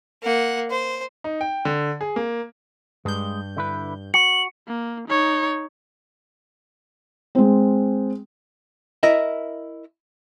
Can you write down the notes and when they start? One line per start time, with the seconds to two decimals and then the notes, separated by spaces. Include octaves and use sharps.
0.23 A#3 F#5
0.70 C5
1.24 D#4
1.41 G5
1.65 D3
2.01 G#4
2.16 A#3
3.05 G2 G#3 G6
3.57 D3 E4 B4
4.14 F#4 C#7 F#7
4.68 A#3
5.08 D#4 C#5
7.35 G#3 C4
9.03 E4 A#4 D#5 E5